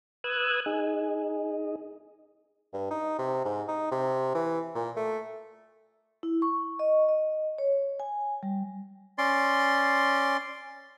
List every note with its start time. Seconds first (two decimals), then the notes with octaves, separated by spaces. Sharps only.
0.24 B4 D#6 E6 F#6 G#6
0.66 D#4 G#4
2.73 G2
2.91 D#4
3.19 C3
3.45 G#2
3.68 D#4
3.91 C3
4.35 E3
4.75 A#2
4.96 A3
6.23 E4
6.42 C#6
6.79 D#5
7.09 D#5
7.58 C#5
8.00 G#5
8.43 G3
9.18 C#4 D5 C6